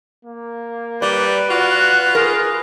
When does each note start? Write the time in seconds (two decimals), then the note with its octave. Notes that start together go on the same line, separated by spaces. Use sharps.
0.25 A#3
1.02 G3 B4 D5
1.50 F4 F#4
2.15 G#4 A#4